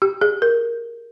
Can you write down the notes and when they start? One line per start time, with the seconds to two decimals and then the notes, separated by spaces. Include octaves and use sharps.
0.02 G4
0.21 G#4
0.42 A#4